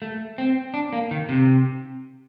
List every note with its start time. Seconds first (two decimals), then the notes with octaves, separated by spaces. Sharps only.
0.02 A3
0.38 C4
0.74 D4
0.93 A#3
1.11 D#3
1.29 C3